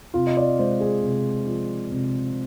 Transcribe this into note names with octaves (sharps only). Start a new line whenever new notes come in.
C3 F4
D#5
D5
G#3 C5
G#4
C3
F3
C3